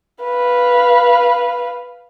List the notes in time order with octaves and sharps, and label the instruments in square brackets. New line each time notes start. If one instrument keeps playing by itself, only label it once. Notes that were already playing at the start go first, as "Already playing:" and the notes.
[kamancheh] B4 F5